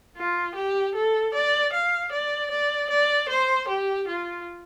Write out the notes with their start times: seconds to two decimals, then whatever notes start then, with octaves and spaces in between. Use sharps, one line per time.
0.17 F4
0.56 G4
0.95 A4
1.34 D5
1.73 F5
2.12 D5
2.51 D5
2.90 D5
3.29 C5
3.68 G4
4.08 F4